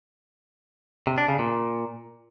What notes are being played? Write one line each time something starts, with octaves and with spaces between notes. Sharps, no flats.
C3
D4
C#3
A#2